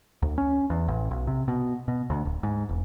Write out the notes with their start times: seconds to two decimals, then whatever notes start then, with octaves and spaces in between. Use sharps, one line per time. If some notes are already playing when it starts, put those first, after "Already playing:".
0.22 D2
0.38 C#4
0.70 E2
0.88 A1
1.11 B1
1.27 C3
1.48 B2
1.88 B2
2.10 D2
2.25 D1
2.43 G#2
2.69 E1